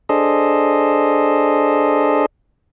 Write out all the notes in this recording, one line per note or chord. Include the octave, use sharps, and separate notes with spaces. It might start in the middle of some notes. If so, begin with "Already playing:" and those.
D4 G#4 A4 C5 D#5